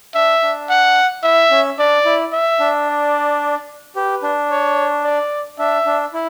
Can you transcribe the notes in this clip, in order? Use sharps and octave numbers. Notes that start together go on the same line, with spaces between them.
D4 E5
D4
F#5
E4 E5
C#4
D4 D5
E4
E5
D4
D5
G4 B4
D4
C#5
D5
D4 E5
D4
E4